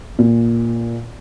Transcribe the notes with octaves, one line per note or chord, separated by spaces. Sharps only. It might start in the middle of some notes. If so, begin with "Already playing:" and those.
A#2